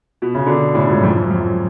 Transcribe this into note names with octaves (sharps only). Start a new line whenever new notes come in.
B2
C#3
B2 D3
A2 C#3
G#2 B2
F2 G#2
F#2
F2
F#2